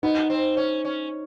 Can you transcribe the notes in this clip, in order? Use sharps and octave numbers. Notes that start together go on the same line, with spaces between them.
B3 D#4
C4
C#4
C#4